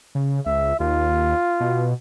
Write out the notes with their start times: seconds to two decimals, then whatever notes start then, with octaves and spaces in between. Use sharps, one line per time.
0.15 C#3
0.46 C#2 E5
0.80 D#2 F4
1.60 B2